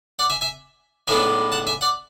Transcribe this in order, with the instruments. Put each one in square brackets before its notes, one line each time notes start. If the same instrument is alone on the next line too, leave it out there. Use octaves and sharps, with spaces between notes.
[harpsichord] D5 F#5
E5 G#5
E5 G#5
B1 A2 G#3 B3 D4 E5 G#5
F#5 A5
E5 G#5
D5 F#5